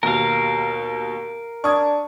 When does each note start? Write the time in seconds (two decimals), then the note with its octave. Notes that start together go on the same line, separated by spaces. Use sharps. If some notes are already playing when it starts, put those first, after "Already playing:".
0.03 D#2 B2 A#4 F5
1.64 D4 C#6 D#6 G#6